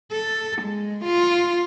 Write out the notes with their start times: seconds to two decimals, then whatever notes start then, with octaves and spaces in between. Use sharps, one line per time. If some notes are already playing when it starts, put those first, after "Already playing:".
0.13 A4
0.62 G#3
1.05 F4